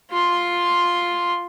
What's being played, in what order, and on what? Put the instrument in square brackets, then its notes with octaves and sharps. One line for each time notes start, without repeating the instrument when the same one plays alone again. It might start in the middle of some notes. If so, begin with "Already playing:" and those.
[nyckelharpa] F4 C6